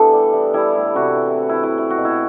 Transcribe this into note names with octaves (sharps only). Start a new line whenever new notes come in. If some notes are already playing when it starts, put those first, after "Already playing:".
Already playing: E3 A3 B3 D4 G4 A4
G3
E3
G3 E4
A2
C3 F#4
E3
C4
E4
E3
E4
C4 E4
F#4
B2
E4